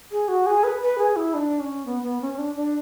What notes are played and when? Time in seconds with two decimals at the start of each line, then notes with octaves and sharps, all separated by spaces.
0.12 G#4
0.28 F#4
0.46 G#4
0.64 B4
0.82 B4
0.98 G#4
1.16 E4
1.34 D4
1.60 C#4
1.86 B3
2.03 B3
2.21 C#4
2.34 C#4
2.38 D4
2.56 D4